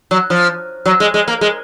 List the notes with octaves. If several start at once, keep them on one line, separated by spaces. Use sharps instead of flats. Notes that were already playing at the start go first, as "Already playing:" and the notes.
F#3
F3
F#3
G#3
G#3
A#3
G#3